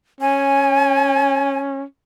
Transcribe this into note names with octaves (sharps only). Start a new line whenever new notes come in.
C#4 G#5